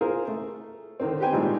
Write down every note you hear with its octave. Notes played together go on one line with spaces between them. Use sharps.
F4 G#4 A#4 C5
A3
D3 D#3 C4
G4 B4 C5 G5 G#5
G#1 A#2 G3 G#3